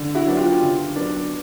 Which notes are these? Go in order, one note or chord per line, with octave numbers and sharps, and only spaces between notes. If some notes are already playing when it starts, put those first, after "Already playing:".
Already playing: D3
E4 F#4
F#3 B3 D4
F4 G4
D3
F#3 B3 D4